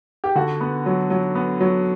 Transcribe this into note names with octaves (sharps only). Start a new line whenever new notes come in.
G4
D3 F#4
B3
F#3
F#3
B3
F#3